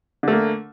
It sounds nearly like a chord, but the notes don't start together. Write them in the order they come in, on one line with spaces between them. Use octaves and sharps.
D3 A3 A#3